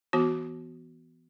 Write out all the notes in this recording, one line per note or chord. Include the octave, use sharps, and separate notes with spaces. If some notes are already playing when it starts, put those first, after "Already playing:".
E3 B3 F#4